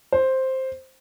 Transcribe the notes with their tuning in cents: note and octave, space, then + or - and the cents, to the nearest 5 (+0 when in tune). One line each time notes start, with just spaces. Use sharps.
C5 +5